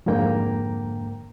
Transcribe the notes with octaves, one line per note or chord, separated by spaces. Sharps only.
F2 G#2 D3 A#3 G5 A#5